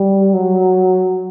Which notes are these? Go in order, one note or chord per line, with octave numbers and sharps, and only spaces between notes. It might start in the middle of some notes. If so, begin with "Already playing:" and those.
Already playing: G3
F#3